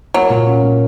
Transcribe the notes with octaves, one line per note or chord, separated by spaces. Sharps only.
F#3 A#3
A#2
C#4
A#2